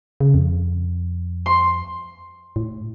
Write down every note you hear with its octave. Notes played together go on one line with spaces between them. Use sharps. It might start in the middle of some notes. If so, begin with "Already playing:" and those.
C#3
F2
C6
A2